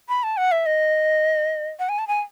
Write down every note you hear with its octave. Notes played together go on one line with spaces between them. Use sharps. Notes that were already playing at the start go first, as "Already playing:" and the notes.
B5
A5
F#5
E5
D#5
F#5
G#5
A5
G#5